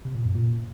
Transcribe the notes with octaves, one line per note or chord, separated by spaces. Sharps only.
C3
A#2
F#2
A#2